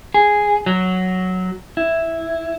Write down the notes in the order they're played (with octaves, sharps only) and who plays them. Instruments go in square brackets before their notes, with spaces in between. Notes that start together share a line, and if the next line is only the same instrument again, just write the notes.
[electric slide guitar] G#4
F#3
E4